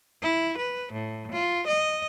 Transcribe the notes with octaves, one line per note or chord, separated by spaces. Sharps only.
E4
B4
A2
F4
D#5